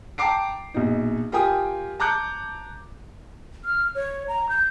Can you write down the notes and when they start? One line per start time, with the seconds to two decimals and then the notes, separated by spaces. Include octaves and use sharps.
0.18 G5 A5 A#5 D6 C7 D7
0.74 A#1 B2 D#4
1.32 F4 G4 A#4 G5 G#5 D#6
2.00 A5 A#5 D6 F#6 G6 C#7
3.65 F6
3.95 C#5
4.28 A#5
4.49 G6